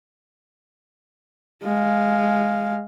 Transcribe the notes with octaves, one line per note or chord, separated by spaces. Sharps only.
G#3 F5